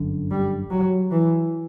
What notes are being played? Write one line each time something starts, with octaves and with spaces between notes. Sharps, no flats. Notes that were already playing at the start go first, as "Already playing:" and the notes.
Already playing: G1 F#2 D3
G3
F#3
E3